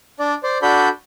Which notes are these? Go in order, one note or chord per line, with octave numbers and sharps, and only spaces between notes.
D4 D5
C5 D5
D4 F#4 A4 D5 B5 G6